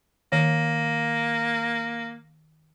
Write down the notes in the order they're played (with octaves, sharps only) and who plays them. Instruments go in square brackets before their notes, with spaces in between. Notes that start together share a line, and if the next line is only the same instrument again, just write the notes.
[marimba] D#3 [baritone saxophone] A#3